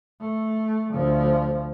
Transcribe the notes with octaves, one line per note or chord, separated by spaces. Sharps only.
A3
D2 F3